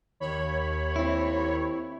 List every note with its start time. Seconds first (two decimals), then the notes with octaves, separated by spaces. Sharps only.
0.20 D#2 C#5 B5
0.96 C4 E4